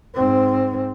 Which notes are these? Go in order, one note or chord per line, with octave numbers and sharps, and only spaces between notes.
G#2 C4